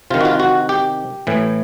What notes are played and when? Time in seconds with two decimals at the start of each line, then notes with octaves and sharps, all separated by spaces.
0.10 C3 D#3 F4
0.21 F#4
0.25 F4
0.40 F#4
0.69 G4
1.27 A2 E3